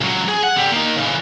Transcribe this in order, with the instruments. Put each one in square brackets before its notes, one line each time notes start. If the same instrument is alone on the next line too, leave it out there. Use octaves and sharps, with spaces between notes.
[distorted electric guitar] C#2 F#3
G#4
F#5
D3 G4
A#3 D#4
C#3 E3